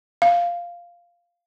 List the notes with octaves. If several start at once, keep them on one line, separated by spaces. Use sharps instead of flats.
F5